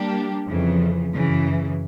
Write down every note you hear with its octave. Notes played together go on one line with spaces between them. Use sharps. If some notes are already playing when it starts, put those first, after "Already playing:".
Already playing: G3 A#3 D4 G4
F2 C#3 E3
F#2 C#3 E3